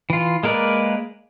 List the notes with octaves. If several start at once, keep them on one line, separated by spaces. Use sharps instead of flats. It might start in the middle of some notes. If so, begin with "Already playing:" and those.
E3 F4
G#3 A#3 A#4 B4 D5